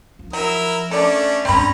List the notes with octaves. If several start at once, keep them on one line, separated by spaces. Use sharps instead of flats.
F3
F#3 E4 A#4 E6
A3 C#4 D4 A4 D5
G1 G2 C4 C#4 A#5 B5